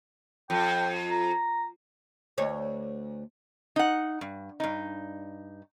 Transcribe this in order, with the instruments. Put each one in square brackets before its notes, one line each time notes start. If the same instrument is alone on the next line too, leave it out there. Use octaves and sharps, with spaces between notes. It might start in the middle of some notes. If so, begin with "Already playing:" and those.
[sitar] F2 [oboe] G5
[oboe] A#5
[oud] D2 C#5
[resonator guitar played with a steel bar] D#4 F#5
G2
G2 D#4